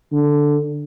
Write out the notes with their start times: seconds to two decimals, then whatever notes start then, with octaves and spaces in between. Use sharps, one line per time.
0.13 D3